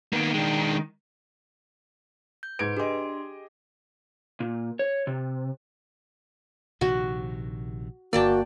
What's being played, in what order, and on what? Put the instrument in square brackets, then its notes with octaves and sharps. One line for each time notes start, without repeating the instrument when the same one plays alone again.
[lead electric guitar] D#3 [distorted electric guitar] A#3 B3
[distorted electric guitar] G#3 D4
[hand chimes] G6
[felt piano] G#2 G#6 D7 [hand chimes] B4
[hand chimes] D4 C6 [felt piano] G4 G#4 D#5
[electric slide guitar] A#2
C#5
C3
[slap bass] A#1 C3 D#3 [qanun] F#4
[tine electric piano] G1 A#3 [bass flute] F#4 [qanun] D5 G5 A5